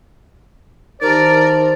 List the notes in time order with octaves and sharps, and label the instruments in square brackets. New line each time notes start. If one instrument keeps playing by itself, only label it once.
[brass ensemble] D#3 E4 C5 [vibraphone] D#4 G4 A5 [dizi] A#4 [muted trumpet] D5